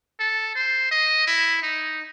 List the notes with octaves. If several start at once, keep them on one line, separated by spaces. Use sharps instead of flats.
A4
C5
D#5
E4
D#4